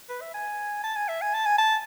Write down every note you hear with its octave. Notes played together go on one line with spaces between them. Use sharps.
B4
E5
G#5
A5
G#5
E5
G#5
A5
G#5
A5